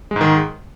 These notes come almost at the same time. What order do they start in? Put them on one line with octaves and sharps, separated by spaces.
G#3 G#2 D#3